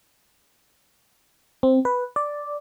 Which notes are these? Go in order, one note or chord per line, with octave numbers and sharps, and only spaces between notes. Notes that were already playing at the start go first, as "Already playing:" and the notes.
C4
B4
D5